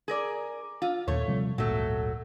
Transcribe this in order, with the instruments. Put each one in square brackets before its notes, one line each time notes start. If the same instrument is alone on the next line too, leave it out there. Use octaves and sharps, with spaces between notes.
[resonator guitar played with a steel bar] G#4 A#4 D5
F4
[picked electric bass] D#2 A#2 [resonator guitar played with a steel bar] A3 C#5
[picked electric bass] C3 F3 G3
[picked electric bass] D1 G#1 A#2 [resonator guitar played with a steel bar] F#3 A3